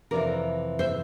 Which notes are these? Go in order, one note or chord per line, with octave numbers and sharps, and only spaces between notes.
F2 C3 E3 A#4 D5
C5 E5